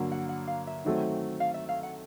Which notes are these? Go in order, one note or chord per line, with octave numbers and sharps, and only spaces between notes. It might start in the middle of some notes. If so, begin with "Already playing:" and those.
Already playing: G2 D3 F#3 A#3
F#5
F#5
F5
E5
D#3 F#3 A3 C4
F5
E5
F5
F#5